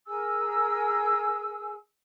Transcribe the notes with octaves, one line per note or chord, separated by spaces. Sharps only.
G#4 A#4 G#5 E6